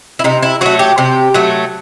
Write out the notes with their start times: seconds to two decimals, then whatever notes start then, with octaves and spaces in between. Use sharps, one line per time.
0.19 E4
0.24 C3 D#4
0.43 E4
0.61 F#3 A3 F#4
0.79 G4
0.98 C3 G4
1.34 F#3 A3